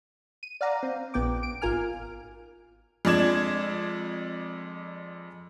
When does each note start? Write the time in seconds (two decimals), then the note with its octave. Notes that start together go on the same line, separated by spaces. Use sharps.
0.43 D#7
0.61 D5 F5 F#5 A#5
0.83 C4
1.14 A#1 B3 G5 D6
1.43 D7
1.62 G#1 F4 A#4 G#5 F6
3.05 F2 G#3 D4 D5 G#6 E7